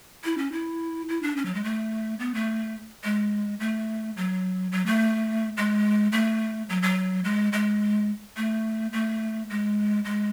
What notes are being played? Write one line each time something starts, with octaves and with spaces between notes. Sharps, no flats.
E4
C#4
E4
E4
D4
C#4
F#3
G#3
A3
B3
A3
G#3
A3
F#3
F#3
A3
G#3
A3
F#3
F#3
G#3
G#3
A3
A3
G#3
G#3